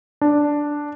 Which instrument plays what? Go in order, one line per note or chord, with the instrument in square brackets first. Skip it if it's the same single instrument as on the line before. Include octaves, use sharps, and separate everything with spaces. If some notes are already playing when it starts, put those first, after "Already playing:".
[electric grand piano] D4